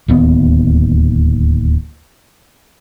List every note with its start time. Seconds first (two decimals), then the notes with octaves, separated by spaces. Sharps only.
0.08 D1 D#2 B3